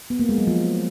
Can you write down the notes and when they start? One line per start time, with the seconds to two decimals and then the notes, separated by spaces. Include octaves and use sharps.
0.10 B3
0.19 A#3
0.29 G#3
0.38 F#3
0.47 F3